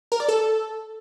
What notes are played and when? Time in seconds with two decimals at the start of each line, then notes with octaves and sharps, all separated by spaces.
0.12 A#4
0.20 D5
0.28 A4